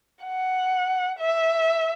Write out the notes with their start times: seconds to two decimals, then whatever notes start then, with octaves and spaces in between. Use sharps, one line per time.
0.24 F#5
1.19 E5